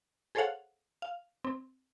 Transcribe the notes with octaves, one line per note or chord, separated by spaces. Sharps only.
G#4 A4 C5 C#5 F5 F#5
F5
C4